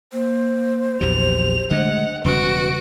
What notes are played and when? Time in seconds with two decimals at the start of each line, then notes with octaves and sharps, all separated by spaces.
0.13 A#3 C5
1.01 A#1 E2 F#3 G4 F7
1.71 D3 G#3 A3 D#5 F#5
2.24 E1 C#3 G3 F#4 B4 D7